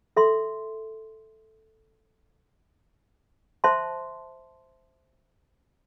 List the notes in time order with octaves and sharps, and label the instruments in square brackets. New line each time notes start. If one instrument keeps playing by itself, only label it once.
[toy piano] A4 E5 C6
C5 E5 A5 C6